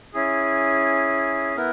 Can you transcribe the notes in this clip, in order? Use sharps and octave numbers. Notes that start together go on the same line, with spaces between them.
C#4 E4 G#4
B3 E4 A#4